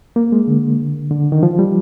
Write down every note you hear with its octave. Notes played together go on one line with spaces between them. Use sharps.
A#3
G#3
D3
D3
D#3
F3
G3